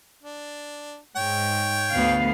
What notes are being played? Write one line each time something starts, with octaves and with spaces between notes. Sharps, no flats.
D4
G#2 C#5 G5
D2 B3 F5